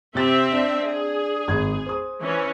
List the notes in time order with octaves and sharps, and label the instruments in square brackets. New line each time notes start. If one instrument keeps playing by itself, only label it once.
[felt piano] C3 G4 A6 [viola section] C4 E5
[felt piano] D4
[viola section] G#4
[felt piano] G#1 G#6
C5 D#6
[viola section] E3 C#4